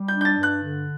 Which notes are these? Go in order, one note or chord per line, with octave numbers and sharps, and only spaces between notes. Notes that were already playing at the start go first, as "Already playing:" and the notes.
Already playing: G3
G6
D4
G6
A6
G2
F#6
D3